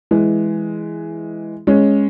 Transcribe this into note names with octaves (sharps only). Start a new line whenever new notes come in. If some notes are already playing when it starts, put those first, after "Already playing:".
E3 G#3
G#3 C#4